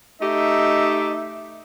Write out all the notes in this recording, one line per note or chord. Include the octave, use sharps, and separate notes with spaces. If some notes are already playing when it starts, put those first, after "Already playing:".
A3 D#4 G4 D#5 E5